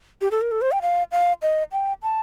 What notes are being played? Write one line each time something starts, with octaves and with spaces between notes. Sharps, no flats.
G4
A4
A#4
A4
C5
G5
F5
F5
D#5
G5
A5